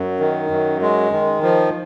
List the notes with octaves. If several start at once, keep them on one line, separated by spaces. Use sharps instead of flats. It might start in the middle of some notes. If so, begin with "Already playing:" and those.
Already playing: F#2
D#3
F#2
G#3
D#3
F3